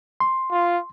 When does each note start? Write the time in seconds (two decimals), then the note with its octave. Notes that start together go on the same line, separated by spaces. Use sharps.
0.20 C6
0.51 F4